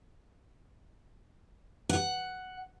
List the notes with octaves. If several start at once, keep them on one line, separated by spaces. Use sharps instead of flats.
F#5